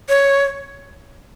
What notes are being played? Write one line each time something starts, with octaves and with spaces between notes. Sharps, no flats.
C#5